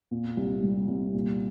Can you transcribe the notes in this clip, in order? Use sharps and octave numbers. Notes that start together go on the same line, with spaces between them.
A#2
C2
G3
C2
A#2